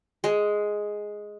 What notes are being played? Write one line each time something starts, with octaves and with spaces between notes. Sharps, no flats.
G#3